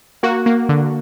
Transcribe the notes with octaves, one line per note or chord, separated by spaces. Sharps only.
A#3 F#4
A#3
D3